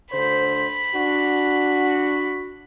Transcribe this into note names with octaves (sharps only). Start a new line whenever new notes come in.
D2 D3 C5 B5
D4 F#4